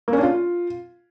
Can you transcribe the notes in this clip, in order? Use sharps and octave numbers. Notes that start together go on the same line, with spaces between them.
A#3
C#4
D4
F4